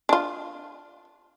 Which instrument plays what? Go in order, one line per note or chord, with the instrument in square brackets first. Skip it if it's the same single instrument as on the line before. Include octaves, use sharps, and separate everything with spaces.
[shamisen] D4 F4